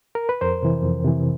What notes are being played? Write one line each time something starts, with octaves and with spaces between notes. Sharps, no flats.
A#4
B4
F2 A#4 C5
C3 E3
F2
C3 E3